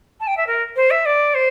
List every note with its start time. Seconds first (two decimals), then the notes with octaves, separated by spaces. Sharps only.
0.20 A5
0.27 G5
0.37 E5
0.46 A#4
0.75 C5
0.90 E5
1.05 D5
1.34 C5